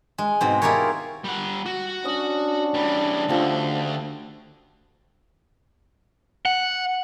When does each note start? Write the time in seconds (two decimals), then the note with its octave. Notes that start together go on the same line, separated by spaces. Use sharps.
0.18 G#3
0.41 G#2 B2 C4
0.62 E4 F4 G4 G#4 A#4 C#5
1.24 G3 F#5
1.66 F#4
2.04 C#4 D4 D#5
2.74 E3 G3
3.28 D2 D3 F3 F#4 G4
6.45 F#5